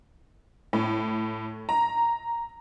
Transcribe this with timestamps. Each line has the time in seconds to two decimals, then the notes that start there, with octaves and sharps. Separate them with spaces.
0.73 A2
1.69 A#5